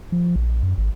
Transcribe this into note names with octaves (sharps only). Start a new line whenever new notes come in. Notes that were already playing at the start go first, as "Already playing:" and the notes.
F3
A#1
F#2
G#1